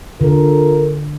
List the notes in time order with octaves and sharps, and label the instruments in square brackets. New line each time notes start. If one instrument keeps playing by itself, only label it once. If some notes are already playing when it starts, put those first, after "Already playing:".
[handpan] D3 [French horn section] F4 A4 A#4